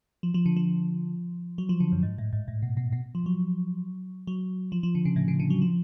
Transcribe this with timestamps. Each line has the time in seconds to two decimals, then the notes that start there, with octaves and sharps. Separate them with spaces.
0.23 F3
0.34 F3
0.46 D3
0.57 F3
1.58 F#3
1.69 F3
1.80 D3
1.92 F#2
2.03 G#2
2.18 A2
2.33 G#2
2.48 A2
2.62 B2
2.77 B2
2.93 B2
3.15 F3
3.26 F#3
4.27 F#3
4.72 F3
4.83 F3
4.95 D3
5.05 C#3
5.16 A2
5.28 C#3
5.40 D3
5.50 F#3
5.62 F3